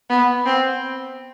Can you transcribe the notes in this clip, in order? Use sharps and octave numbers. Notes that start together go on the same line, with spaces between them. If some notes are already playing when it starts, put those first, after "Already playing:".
B3
C4